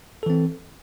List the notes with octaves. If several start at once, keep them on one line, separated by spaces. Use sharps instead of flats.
E3 C4 A4